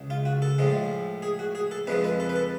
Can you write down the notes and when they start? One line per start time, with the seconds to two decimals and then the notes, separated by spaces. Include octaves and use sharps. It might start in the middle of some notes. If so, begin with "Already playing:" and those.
Already playing: C#2 C#3 G#3
0.10 F4
0.25 F#4
0.42 A4
0.59 A2 F3 G#3
1.22 G#4
1.39 F#4
1.55 G#4
1.71 A4
1.87 F2 F3 G#3 B4
2.04 B4
2.20 A4
2.29 B4
2.36 A4